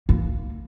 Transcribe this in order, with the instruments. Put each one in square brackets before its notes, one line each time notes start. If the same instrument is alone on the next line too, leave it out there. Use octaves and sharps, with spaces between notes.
[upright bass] A#3